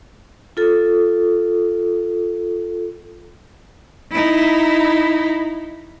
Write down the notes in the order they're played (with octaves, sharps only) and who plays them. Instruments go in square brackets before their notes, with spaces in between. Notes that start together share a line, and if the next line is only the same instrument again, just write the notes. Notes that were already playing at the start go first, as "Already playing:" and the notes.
[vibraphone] F4 A4
[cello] D#4 E4